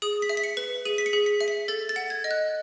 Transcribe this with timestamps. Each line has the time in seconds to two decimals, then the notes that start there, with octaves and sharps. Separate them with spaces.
0.02 G#4 D#6
0.22 B6
0.29 E5
0.37 B6
0.44 C#7
0.57 B4
0.85 G#4 D#7
0.98 B6
1.06 C#7
1.13 G#4
1.26 B6
1.41 E5
1.48 B6
1.68 A4 A6
1.89 A6
1.96 F#5
2.10 G#6
2.24 D#5
2.31 F#6